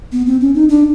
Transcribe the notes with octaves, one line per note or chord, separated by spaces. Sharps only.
B3
C4
C#4
D#4
D4